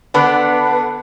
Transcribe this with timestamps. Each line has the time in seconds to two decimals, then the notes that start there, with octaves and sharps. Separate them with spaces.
0.14 D3 B3 D4